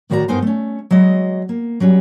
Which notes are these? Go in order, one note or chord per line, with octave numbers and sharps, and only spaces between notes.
A2 D#3 F#4 D5 F5 A#5
G2 B3 D#4 A#4 C5 G#5
A3 C#4
F#3 G#3 D#5
A#3
F#3 G3 C#4